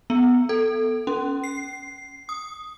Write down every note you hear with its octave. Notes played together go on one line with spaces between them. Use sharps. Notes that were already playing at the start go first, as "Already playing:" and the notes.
B3
A4
C#4
C7
D#6